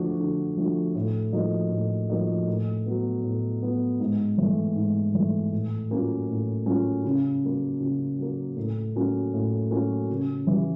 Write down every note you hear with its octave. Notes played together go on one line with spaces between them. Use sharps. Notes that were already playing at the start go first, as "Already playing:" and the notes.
Already playing: D3 F3 A3 D4 F#4
D3
F3 A3 D4 F#4
A2
F3 A#3 D#4 F#4
A2
F3 A#3 D#4 F#4
A2
F#3 B3
A2
F#3 B3
G#2
E3 A3
G#2
E3 A3
A2
F#3 A#3 C#4 F4
A2
F#3 A#3 C#4 F4
C#3
F#3 A#3
C#3
F#3 A#3
A2
F#3 A#3 C#4 F#4
A2
F#3 A#3 C#4 F#4
C#3
E3 G3